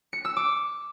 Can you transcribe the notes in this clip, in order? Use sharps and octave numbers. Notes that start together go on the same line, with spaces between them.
C#7
E6
D6